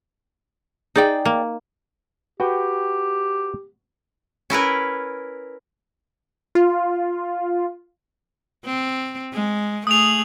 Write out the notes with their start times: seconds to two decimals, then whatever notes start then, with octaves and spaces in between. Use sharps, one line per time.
0.96 D#4 G#4 D5 G5
1.25 A#3
2.40 F#4 G4 B4 G5
4.50 C#4 E4 A#4 B4
6.55 F4
8.65 C4
9.34 G#3
9.87 A3 G#4 D#6 F7